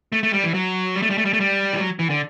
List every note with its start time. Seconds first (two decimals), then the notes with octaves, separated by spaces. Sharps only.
0.12 A3
0.23 A3
0.33 G3
0.44 E3
0.54 F#3
0.95 G3
1.02 A3
1.10 G3
1.18 A3
1.25 G3
1.33 A3
1.40 G3
1.73 E3
1.78 F#3
1.99 E3
2.10 D3